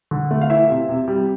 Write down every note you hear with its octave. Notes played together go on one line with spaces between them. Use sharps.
D3
A3
F5
E3 E4 E5
C3
C3
G3